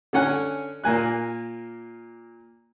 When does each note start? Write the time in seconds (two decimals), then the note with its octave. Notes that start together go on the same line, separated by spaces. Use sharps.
0.13 D3 C#4 F#5 G#5
0.84 A#2 A#3 G#5 F#6